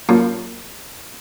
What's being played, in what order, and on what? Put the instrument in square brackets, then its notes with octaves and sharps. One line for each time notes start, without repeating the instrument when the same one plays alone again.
[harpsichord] F#2 A#2